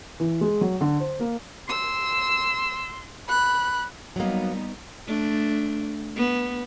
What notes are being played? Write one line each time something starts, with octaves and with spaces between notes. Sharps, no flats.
E3
G#3
F#3
D3
C5
A#3
C6 E6
B5 F#6
F#3 G3 A#3 B3 D#4
A3 D4
B3